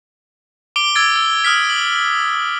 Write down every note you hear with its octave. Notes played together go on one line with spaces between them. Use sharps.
D6 D7 G7
E6 G#6 A6 D7
E6
D#6 F6 B6
F#7